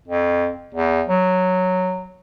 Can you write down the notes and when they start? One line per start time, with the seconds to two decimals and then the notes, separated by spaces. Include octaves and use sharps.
0.08 F2
0.74 E2
1.08 F#3